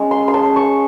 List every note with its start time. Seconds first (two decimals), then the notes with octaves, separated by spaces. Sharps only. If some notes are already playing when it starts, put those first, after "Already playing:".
Already playing: G#3 C#4
0.11 C6
0.28 C6
0.34 A5
0.56 C#6